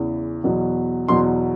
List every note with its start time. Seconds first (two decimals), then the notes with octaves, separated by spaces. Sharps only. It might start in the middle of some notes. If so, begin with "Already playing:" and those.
Already playing: E2 C#3 E3
0.44 E2 B2 F#3
1.08 E2 B2 F#3 C6